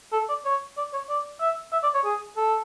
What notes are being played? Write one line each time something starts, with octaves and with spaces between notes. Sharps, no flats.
A4
D5
C#5
D5
C#5
D5
E5
E5
D5
C#5
G#4
A4